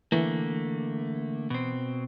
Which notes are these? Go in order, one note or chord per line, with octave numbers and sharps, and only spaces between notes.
D3 E3 A3 A#3
B2 C4